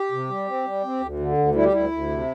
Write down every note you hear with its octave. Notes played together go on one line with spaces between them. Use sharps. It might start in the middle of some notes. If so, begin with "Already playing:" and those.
Already playing: G4
C3
G3
C4
G3
C4
D2
D3
D2
G3 E4
G4
D2 E4
D2
C3